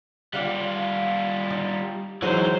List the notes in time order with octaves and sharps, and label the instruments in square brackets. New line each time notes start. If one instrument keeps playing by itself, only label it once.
[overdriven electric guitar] G3 F4 [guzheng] D5 F5 F#5
[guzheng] D#4
[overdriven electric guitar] E3 D#4 [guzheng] F#3 G#3 [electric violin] C5